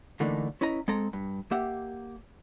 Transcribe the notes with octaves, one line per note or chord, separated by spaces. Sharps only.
D3 E3 A3 A#3 D4 D#4
C#4 E4 B4 D#5 A#5
G#3 C4 A4 A#5
G2
A#3 G4 E5 F#5